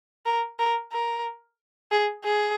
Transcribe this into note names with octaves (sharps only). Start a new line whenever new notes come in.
A#4
A#4
A#4
G#4
G#4